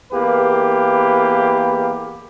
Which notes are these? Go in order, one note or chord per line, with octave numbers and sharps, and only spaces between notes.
E2 A#3 G4 B4